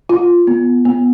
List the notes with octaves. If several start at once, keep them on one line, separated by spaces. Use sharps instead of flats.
F4
B3
B3